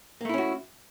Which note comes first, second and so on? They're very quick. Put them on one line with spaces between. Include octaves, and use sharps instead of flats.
A#3 A3 E4 C#4 F#4